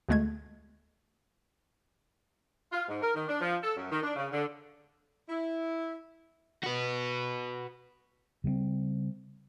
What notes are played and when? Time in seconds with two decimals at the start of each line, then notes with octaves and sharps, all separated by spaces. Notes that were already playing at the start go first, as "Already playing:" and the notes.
0.09 D2 D3 G#3 A3 G#6
2.72 F4
2.88 G#2
3.02 A#4
3.15 D#3
3.28 D4
3.41 F3
3.62 A4
3.77 F#2
3.92 D#3
4.03 D4
4.16 C#3
4.32 D3
5.29 E4
6.64 F#4 B4
8.44 C#3 G3 A#3 C4